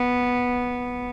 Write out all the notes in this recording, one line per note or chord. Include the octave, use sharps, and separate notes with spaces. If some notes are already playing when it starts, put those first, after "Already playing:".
Already playing: B3